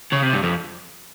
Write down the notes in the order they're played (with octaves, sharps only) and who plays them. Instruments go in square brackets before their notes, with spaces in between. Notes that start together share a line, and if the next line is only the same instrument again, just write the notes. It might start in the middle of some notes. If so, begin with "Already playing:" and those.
[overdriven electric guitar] C#3
C3
G2
F2